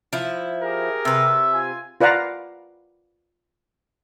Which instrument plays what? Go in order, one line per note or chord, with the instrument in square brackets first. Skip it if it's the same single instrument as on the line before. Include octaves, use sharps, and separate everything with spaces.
[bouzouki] F3 E4
[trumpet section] G4 G#4 A#4
[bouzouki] C3 B4 [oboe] E5
[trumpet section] F4 G#5
[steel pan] F4 B4 D5 F5 F#5 A#5